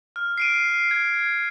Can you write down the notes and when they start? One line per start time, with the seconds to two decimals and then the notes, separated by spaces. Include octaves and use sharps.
0.16 F6
0.38 C7 D7 D#7
0.91 G#6